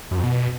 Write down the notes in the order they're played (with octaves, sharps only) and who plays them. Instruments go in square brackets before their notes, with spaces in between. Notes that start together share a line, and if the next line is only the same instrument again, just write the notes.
[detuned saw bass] F#2
F2
B2